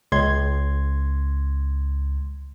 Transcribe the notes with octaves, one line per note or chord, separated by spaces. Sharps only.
C#2 C6 G#6